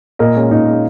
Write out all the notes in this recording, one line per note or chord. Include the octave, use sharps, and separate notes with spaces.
A#2 A#4 D#5
G#3 C#4
A#2 D#4
G#3 C#4